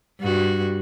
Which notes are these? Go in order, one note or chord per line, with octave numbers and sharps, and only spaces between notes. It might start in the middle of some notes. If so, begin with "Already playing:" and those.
G2 F#4